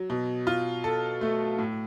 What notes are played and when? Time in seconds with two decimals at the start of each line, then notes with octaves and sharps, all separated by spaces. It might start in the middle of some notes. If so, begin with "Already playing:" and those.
Already playing: F#3
0.10 B2
0.47 F4
0.84 A4
1.21 A3
1.59 A2